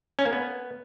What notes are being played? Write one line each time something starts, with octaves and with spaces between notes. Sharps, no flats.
C#4
A#3
B3